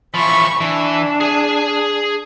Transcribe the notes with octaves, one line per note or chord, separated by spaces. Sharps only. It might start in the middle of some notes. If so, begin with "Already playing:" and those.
E3 F3 B5 C#6
E3 D4
G#4 G#5